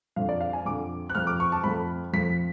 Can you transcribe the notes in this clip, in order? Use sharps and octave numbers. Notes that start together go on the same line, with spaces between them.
F2 D3 F3 F5
D5
F5
G#5
F2 D3 F3 D6
F#6
F2 F3 A3 F6
D6
C#6
A5
F2 F3 A3 B5
F2 F3 A3 B6